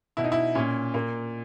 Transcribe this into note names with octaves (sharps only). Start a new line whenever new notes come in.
B2 E4
D#4
E4
A#2 C#4
A#2 A#3